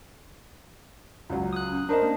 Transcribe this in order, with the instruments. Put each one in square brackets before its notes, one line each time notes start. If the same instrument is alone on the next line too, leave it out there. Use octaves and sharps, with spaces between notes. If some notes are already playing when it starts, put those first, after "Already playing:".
[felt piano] C#2 F#3
[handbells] D#6 F#6
[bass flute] C#4
[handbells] D4 D#5 [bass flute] A#4 [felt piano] C5 D5 A#5
[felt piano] A#3